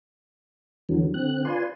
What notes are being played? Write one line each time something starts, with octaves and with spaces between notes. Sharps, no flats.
E2 D3 E3 F#3
D3 C4 F#6
F4 B4 D5 G#5 C6